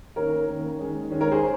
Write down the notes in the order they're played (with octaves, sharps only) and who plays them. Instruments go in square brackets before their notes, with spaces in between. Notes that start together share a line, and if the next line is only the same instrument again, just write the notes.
[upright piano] D#3 A#3 C#4 A#4 C#5
D#3 A#3 C#4
D#3 G#3 C#4
D#3 G#3 C#4
A#4 C#5
G#4 C5